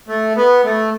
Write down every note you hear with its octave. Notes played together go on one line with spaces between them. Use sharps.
A3
B3
A3